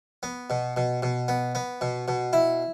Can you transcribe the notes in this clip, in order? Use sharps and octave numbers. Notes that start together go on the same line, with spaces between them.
B3
B2
B2
B2
B3
B3
B2
B2
E4